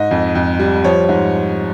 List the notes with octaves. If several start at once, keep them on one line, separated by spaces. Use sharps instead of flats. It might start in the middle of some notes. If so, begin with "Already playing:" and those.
Already playing: G#2 D#5
F2
F2
G3
F3 C#5
G#2